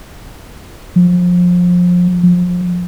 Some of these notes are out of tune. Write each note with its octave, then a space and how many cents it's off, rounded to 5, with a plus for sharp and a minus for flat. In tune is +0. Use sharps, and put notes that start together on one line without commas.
F3 +25
F3 +25